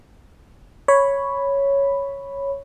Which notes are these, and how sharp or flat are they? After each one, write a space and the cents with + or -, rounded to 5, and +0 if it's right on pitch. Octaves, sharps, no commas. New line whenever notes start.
C#5 +0 B5 +0